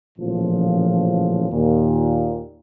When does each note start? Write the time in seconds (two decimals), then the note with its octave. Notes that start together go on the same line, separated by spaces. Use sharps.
0.19 A1 A#2 C#3 F3
1.51 D#2 A#2